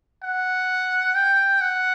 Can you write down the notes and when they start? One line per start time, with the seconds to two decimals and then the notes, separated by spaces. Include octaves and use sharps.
0.23 F#5
1.15 G5
1.61 F#5